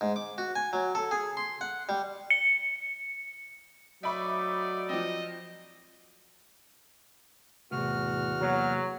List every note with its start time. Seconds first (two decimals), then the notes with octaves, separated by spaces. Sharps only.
0.01 G#2
0.16 D6
0.38 F#4
0.56 G#5
0.73 F#3
0.95 A4
1.11 G#4
1.37 C6
1.61 F#5
1.89 G3
2.30 C#7
4.03 F#3 A3 D#4 D5 E5 B5 C#6
4.89 F3 C4 D#5
7.72 E2 A2 C3 F#4 F6
8.41 C3 F#3 A#3